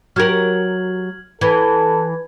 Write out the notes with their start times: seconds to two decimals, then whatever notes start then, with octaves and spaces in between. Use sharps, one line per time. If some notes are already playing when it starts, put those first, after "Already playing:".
0.16 F#3 G4 A#4 F6 G#6 F#7
1.41 E3 A4 B4 G#6